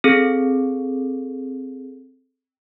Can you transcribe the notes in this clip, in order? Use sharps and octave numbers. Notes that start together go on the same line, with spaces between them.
C4 G#4 A4